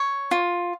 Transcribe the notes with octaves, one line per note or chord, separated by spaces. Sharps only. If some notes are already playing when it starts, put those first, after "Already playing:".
Already playing: C#5
F4